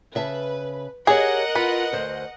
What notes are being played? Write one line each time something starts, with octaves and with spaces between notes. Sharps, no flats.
C#3 B4 E5 A5
G4 G#4 A#4 C#5 D#5 F#5
F4 B4
D2 C5